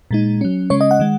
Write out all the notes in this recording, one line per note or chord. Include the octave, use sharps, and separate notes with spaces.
A#2 G#3 D#4
F#3 C#4
C#3 G#3 C#4 C#5
D#5
F#5
D#3 G#3